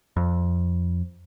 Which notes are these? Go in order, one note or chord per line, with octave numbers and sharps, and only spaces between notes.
F2